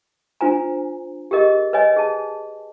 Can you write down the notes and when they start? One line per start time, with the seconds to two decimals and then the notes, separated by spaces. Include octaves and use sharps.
0.41 D4 F4 C5 G#5 A#5
1.31 G4 G#4 A#4 D#5
1.73 B4 C#5 D#5 G#5
1.97 G#4 A5